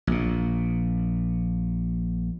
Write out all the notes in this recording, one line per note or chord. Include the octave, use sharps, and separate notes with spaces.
A#1 A#2